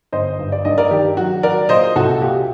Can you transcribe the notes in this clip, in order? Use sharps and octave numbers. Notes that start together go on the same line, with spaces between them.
G1 C5 D#5
G2
D5
G2 D#5
A#4 D5
D#3 G4
F#3 F#4
F#3 A#4 D5
A#2 C5 D#5
C2 F#4 A4
A#2 G4